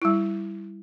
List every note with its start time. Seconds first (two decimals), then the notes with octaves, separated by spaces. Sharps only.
0.02 G3 E4